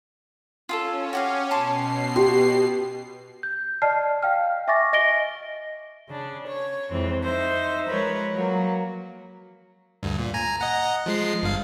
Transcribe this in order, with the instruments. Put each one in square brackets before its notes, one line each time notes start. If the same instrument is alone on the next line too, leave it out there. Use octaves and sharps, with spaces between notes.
[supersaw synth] C#4 [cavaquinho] F4 G#4 A4
[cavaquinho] F#4 G4 F5
[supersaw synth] B2 C7 [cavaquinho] A5 C6 D6
[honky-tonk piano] G4 [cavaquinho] C6
[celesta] G6
D5 D#5 A5 F6 C7
F5 G5 F6
E5 G#5 C#6 D6 A6 A#6
D#5 A#6 D7 G7
[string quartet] C#3 D4
C#5
F2 E3 G#3 C4
D#4 C5 E5
F3 G#3 A#4 B4 C#5
F#3 A#3
[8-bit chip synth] D2 G2
A#2
G#5 A#5
D#5 F#5 A#5
F3 G#3 C7
G1 G2 F5